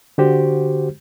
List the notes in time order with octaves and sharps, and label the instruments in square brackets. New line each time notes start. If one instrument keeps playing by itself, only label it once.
[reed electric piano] D3 F#4 G4 C5